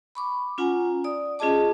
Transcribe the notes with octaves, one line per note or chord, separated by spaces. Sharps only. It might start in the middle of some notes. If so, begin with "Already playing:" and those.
B5 C#6 D6
C#4 F4 F#5 G#5 A#5
D5 D#6
C#4 F4 G#4 D#5 A5 D6